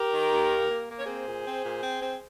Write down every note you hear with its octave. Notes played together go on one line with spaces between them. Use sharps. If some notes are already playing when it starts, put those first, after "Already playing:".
Already playing: G4 A#4
D#3
D#2
A#3
A#3
A#3
C#5
C4 G#4 C5
A#2
C4
A#2
C4
C4